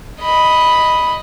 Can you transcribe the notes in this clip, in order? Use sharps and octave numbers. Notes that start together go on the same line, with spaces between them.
D#5 B5